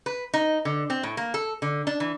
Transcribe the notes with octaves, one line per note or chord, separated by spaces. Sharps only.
B4
D#4
D3
C4
A2
A#3
A4
D3
D4
E3